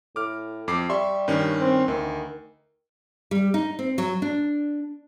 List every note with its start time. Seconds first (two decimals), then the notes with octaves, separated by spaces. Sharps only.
0.16 A2 D6 F6
0.68 F2 D6 C7
0.90 G3 E5 C6 C#6
1.28 G2 D#3 C#4
1.61 C4
1.88 D2 D#3
3.31 G3
3.54 D#4
3.79 C4
3.98 F#3
4.22 D4